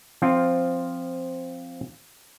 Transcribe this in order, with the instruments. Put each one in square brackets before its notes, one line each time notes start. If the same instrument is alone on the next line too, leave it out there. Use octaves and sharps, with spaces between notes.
[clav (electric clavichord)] F3 C4 F4